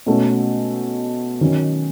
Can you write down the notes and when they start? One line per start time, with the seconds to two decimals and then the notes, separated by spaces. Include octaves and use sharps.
0.06 B2 A3 C#4
1.41 D#3 F#3 C#4